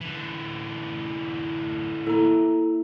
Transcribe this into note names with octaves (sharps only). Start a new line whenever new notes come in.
D3 E3
A#3 E4 A4 A#5